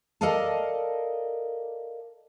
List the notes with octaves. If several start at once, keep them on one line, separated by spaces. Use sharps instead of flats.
A4 A#4 D5 D#5 F5 A5